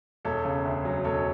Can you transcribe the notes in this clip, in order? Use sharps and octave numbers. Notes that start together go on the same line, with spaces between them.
E1 A4 C#5
C#3
D2
F#3
E1 A4 C#5